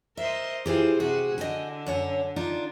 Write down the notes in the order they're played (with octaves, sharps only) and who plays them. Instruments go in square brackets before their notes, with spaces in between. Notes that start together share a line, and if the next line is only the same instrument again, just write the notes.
[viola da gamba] A#4 C5 D#5 [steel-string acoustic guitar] E5
[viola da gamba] E3 F4 [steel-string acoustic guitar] G4 G#4 C5
[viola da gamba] C3 F#4 [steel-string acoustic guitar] G#4
[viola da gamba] D3 [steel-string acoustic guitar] D#5 G5 G#5
[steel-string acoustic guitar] F#2 C#5 F#5
D4 D#4 F4